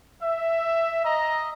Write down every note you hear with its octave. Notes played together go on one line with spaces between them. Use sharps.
E5
D#5 A#5